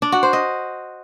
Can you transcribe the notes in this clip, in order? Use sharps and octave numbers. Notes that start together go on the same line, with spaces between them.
D4
F#4
C5
D#5